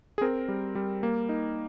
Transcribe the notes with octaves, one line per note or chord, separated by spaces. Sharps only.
G#4
C4 A#4
G3
G3
A#3
D#4